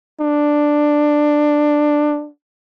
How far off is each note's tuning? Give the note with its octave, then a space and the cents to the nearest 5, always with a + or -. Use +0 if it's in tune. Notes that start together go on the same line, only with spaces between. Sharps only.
D4 +10